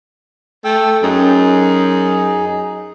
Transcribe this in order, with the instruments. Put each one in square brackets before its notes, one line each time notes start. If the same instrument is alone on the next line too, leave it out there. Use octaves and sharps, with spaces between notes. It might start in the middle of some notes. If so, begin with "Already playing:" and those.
[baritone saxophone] A3 [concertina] G5 E6
[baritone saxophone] F#2 [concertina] D#4 G#4